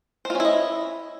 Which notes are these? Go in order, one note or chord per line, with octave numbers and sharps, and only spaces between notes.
C#4 E4 F4 C5 D#5